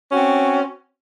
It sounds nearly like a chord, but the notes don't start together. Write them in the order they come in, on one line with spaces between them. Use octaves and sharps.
C#4 F#4 C4